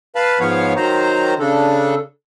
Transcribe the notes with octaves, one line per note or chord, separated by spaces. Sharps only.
B4 F5 A5 B5
G#2 F3 B3 C#5 F5
D#3 F#3 C5 A#5
C#3 D4 A4